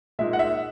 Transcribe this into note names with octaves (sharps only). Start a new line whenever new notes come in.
A#2 G#3 D#4 E5
F#5
E5